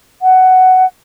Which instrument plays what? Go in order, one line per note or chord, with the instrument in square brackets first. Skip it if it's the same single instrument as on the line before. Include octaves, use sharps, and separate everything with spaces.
[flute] F#5